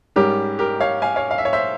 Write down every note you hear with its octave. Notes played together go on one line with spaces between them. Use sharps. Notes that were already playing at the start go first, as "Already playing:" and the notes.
G#2 G3 C#4 G4 A#4
G4 A#4
C#5 F5
F5 G#5
C#5 F5
F5
E5
C#5
C5 E5